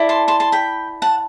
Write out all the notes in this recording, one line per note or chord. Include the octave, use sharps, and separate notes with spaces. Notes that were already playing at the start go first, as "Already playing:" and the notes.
Already playing: E4 A4 D5
A5 C6
A5 C6
A5 C6
G5 B5
F#5 A5